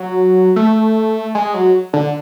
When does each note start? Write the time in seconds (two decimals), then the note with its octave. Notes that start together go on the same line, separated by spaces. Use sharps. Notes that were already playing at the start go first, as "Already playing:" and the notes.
Already playing: F#3
0.56 A3
1.35 G#3
1.54 F#3
1.93 D3